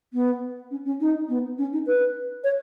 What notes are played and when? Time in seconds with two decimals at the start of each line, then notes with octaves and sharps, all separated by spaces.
0.13 B3
0.71 C#4
0.85 C#4
1.01 D#4
1.29 B3
1.58 C#4
1.73 D#4
1.87 B4
2.44 C#5